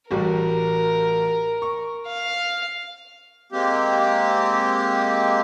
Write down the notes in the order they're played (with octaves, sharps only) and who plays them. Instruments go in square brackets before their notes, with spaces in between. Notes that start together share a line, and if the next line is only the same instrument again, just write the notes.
[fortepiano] A1 G3 F#4 [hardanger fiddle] A#4
[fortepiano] C#6
[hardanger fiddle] F5
[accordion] G#3 A#3 C4 G4